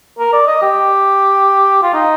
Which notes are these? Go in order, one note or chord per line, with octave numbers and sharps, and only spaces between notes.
A#4
D5
D#5
G4
F4
D#4